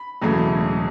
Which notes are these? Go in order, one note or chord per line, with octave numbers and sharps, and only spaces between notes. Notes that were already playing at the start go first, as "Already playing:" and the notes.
Already playing: B5
E1 E2 C#3 F#3 A3